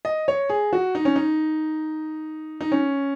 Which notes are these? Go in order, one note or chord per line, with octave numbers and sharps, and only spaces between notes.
D#5
C#5
G#4
F#4
D#4
C#4
D#4
D#4
C#4